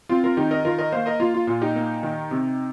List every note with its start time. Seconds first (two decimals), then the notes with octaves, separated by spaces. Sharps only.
0.09 C4 F4
0.24 F4 A#4
0.37 D#3 D#4 G4
0.51 A#4 D#5
0.65 D#3 F4 A#4
0.78 A#4 D#5
0.92 A#3 C5 F5
1.06 A#4 D#5
1.20 A#3 F4
1.34 F4
1.47 A#2 F4
1.61 D#4 G4
1.76 A#3
2.03 D#3
2.31 C3